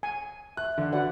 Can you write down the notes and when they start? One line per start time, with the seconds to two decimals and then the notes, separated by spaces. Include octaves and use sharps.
0.03 G#5
0.57 E5 F#6
0.78 D3
0.92 F#4 B4 D5 F#5